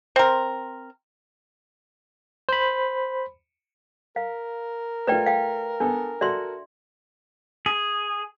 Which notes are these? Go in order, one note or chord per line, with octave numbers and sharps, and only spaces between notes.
C4 A#4
C5 B5
A#4 F5
A3 F4 B4 D5 G5
F5 G5
B3 D4 A4
F#4 A4 D5 E5 C6
G#4